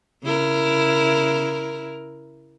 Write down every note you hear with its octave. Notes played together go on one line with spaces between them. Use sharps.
C#3 E4 A#4